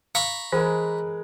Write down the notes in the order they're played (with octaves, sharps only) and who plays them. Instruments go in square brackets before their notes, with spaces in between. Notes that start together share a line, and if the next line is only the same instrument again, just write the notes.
[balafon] F5 [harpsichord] A#5 B5 C#6
[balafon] E3 [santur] G#3 A#4 B4